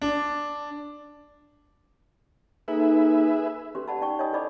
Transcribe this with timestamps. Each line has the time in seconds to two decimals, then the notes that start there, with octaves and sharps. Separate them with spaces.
0.02 D4
2.68 A#3 D#4 G#4 A4 B4 E5
3.75 C#4 G4 A4 B4 C6
3.88 D5 F#5 A5 B5
4.01 D#4 D5 G5 C#6
4.19 C#5 D#5 G5 G#5 B5 D#6
4.32 E4 A4 C5 D5 B5 D6